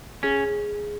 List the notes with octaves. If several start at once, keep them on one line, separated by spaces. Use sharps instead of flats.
C#4 G#4